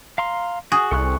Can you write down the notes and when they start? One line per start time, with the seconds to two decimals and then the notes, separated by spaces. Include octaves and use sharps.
0.18 F5 A#5 C6
0.72 F#4 G#4
0.91 C2 A4 C#6 F#6